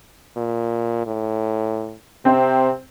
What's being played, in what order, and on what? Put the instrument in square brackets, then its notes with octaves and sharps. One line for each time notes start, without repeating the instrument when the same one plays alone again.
[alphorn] A#2
A2
[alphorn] C3 [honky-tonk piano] C4 C5